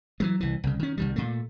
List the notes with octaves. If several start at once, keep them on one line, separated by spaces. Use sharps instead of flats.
E3 F#3 G#3
C2 E3
C2 C#3
D#3 C#4
C2 D#3 G3
A#2 A3